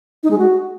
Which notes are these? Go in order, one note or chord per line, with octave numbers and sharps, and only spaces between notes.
D#4
G#3
F#4